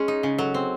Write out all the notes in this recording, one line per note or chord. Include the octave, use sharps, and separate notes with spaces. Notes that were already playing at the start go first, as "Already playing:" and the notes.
Already playing: G#3 C#4 G#4
D#4
C#3
F#3 A4
C4